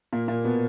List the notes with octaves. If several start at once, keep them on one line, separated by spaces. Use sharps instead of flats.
A#2 A#3
A#2 A#3
B2 B3